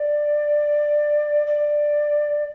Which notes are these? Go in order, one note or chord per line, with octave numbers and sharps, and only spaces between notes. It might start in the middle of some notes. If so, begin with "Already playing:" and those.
Already playing: D5
D5